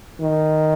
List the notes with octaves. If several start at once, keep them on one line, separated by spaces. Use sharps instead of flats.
D#3